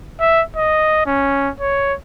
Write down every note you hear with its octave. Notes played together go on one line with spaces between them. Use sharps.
E5
D#5
C#4
C#5